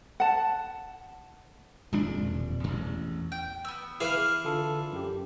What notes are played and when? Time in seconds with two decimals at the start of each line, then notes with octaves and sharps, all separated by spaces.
0.20 F#5 A5
1.93 D#1 F2 G#3 D4
2.21 E1
2.64 A1 E2
3.32 G5
3.65 B3 E6
4.01 E3 G#4 F5 D6 F6
4.45 D3 F4 A4
4.92 F#2 G4